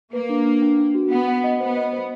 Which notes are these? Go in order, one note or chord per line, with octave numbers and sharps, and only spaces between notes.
A#3 B4
D4
D4
D4
D4
F#4
B3 F#5
F#5
D#5
B3 C5
D#5
C5